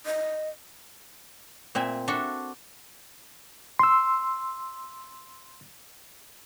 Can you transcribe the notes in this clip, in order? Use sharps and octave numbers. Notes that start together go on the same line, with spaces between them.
D#5
A#2 C4 E5 G#5
D4 F#4 A4 E5
C6 E6